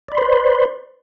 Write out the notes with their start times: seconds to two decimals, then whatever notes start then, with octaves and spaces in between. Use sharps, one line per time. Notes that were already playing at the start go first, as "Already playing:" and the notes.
0.08 D5
0.12 B5
0.15 C6
0.18 C5
0.21 B4